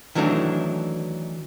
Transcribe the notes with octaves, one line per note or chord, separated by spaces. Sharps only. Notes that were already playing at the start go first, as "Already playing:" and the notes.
D#3 E3 F#3 A3 C#4 D4